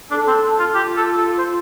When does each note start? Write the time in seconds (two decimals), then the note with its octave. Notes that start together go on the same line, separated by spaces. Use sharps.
0.11 D4 A4
0.27 C4
0.59 F4
0.75 F4 G4
0.96 A4
1.18 A4
1.38 C5